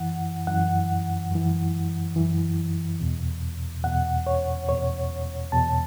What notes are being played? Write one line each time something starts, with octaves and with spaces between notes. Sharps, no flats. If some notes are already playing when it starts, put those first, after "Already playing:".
Already playing: F#2 E3 F#5
F#2 E3 F#5
F#2 E3
F#2 E3
E2 B2
E2 B2 F#5
C#5
E2 B2 C#5
E2 B2 A5